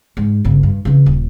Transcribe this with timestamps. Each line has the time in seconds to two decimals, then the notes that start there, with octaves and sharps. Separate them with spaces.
0.17 G#2
0.44 G1 C#3
0.63 G2
0.85 C#3 E3
1.06 D#1